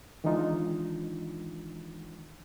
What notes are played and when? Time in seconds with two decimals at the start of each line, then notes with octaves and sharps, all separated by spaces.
0.24 D#3 E3 G#3 D4 D#4 F4